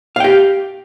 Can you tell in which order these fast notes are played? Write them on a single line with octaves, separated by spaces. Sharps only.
F5 G5 G4